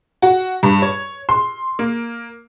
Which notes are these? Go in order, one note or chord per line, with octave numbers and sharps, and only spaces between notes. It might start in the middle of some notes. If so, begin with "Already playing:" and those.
F#4
G2
C#5
C6
A#3